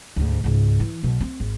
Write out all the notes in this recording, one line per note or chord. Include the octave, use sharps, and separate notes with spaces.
D2 G#2
C#2 G#2
E3
B1 B2
C4
G#1